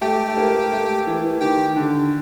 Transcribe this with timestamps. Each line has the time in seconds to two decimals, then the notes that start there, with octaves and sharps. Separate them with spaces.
0.01 A3 G4 G5
0.28 A3
0.37 A#3
0.72 A3
1.07 E3
1.41 D#3 G4 G5
1.76 D3